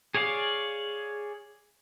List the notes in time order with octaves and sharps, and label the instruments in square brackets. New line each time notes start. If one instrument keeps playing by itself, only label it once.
[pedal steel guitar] G#4 C#5 D5 F5